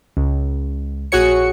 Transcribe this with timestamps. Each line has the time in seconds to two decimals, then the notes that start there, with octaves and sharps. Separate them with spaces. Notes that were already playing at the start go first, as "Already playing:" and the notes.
0.17 C#2
1.12 A#1 F#4 G#4 C#5 C#7